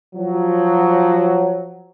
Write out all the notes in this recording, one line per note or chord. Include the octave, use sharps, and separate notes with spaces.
F3 F#3